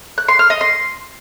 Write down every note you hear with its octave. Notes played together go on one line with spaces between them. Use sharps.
F#6
C6
F6
D#5
C6